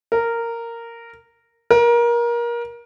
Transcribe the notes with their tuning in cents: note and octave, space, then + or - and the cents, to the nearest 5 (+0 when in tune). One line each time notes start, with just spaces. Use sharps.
A#4 -10
A#4 +25